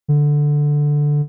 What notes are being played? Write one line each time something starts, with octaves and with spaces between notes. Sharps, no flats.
D3